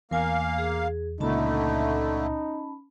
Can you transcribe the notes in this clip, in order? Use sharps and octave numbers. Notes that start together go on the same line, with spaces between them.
E2 A#3 A#4 F5 G#5
G#4
C#2 A#2 D3 A3 C#4 D#4 A5 B5